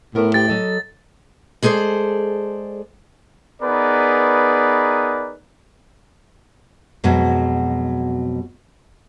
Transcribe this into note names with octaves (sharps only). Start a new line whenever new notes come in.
A2 B3 A#4
G4 B4 G5 A6
F#3 A4 D#5
G#3 G#4 A4 C5 D5
B3 D#4 G#4 A#4 B4 D5
F2 B2 F#3 G#3